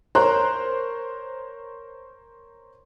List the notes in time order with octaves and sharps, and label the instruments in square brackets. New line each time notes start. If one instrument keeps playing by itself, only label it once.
[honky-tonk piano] A#4 C5 C#5 C6 F#6